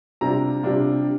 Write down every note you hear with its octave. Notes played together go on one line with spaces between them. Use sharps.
C3 G3 D4 F4 A#5
C3 G3 D4 F4